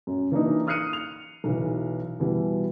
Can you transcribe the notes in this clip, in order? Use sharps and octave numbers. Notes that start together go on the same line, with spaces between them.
F#2
E3 A#3 D4 D#4
D#6 F6 F#6 C7 C#7 D#7
F7
B1 E3
B2 E3 G3